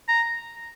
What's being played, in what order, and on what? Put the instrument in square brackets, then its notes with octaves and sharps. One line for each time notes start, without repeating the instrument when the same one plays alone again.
[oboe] A#5